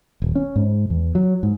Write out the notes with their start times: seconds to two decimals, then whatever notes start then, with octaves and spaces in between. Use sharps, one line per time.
0.22 D#1
0.35 C#4
0.56 G#2
0.90 E2
1.15 F#3
1.43 G#2